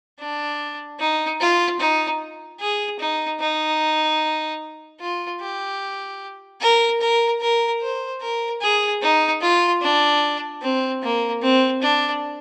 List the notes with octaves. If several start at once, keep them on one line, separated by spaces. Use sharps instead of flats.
D4
D#4
F4
D#4
G#4
D#4
D#4
F4
G4
A#4
A#4
A#4
C5
A#4
G#4
D#4
F4
D4
C4
A#3
C4
D4